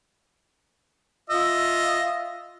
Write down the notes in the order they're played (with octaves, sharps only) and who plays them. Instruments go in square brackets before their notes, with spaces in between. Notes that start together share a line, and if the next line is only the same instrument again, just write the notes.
[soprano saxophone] F4 [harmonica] D#5 E5